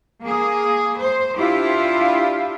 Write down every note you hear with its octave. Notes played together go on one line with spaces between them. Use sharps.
A#3 G#4
C5
D4 E4 F4 G4